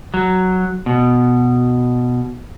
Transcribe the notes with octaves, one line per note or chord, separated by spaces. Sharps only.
F#3
B2